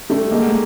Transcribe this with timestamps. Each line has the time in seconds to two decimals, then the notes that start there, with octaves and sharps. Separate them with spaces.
0.10 G3 A3 C#4
0.32 G#3 A#3
0.42 A3